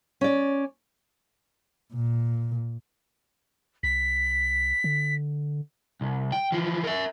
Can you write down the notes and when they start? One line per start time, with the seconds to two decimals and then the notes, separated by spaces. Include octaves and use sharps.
0.21 C#4 D5
1.94 A#2
3.83 C2 B6
4.84 D3
6.01 C2
6.32 G5
6.52 E3 F3
6.83 A#4 E5